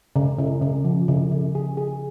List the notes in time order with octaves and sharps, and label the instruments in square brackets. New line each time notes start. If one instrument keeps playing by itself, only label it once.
[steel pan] C#3
C#3
C#3
F3
C#3
C#3
G#4
G#4